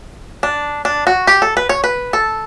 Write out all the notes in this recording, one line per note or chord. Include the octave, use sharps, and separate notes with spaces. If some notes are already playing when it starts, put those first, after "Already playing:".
D4
D4
F#4
G4
A4
B4
C#5
B4
A4